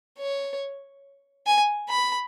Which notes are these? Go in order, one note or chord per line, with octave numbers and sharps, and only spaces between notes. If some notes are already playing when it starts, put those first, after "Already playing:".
C#5
G#5
B5